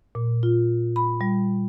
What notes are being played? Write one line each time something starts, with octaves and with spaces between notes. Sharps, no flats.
A#2
F4
B5
G3